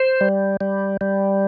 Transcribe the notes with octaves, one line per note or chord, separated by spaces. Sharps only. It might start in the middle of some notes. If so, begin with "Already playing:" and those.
Already playing: C5
G3
G3
G3